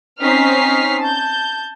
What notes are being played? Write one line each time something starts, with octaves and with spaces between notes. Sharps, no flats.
C4 C#4 D#4 F6 B6 C7
A5 G6